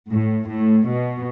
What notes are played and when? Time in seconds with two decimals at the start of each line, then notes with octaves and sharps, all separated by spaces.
0.10 A2
0.49 A2
0.88 B2